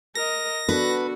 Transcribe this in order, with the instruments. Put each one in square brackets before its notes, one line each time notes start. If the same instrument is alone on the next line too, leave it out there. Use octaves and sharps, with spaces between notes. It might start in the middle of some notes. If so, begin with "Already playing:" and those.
[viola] A#4 D#5 [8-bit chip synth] A#6
[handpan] B3 D4 A4 [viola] F#4 [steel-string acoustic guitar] B4